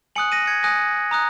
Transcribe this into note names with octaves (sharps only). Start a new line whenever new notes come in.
G#5 D#6 F#6 C#7 F#7
A#6 D#7
G#6 C#7
G#5 D#6 F#6 A#6
A#5 D#6 F#6